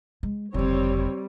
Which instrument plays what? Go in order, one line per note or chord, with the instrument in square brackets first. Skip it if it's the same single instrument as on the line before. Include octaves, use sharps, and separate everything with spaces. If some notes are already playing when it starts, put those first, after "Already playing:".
[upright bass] G#3
[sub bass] F#1 [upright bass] F2 D3 [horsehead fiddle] G3 [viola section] C4 C#5